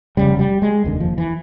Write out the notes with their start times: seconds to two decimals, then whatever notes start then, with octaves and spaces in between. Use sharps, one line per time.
0.17 F1 D#2 C#3 G3
0.39 G3
0.62 G#3
0.84 F1 D#2 D3
1.00 F3
1.18 E3